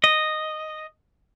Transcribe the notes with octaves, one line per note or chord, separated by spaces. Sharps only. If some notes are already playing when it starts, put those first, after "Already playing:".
D#5